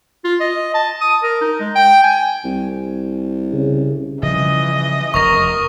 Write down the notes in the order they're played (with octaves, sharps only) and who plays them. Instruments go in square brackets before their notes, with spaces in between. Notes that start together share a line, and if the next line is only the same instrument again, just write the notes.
[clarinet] F4
D#5
A5
D#6
A#4
D#4
G#3
G5
G#5
[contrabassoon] C2
[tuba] C#3
[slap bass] C#3 F3 G3 [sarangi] E3 [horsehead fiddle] D#5
[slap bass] F1 E2 [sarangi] A#4 [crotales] C#6 D#6 A#6